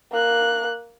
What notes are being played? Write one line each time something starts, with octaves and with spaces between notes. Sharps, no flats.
A#3 F#6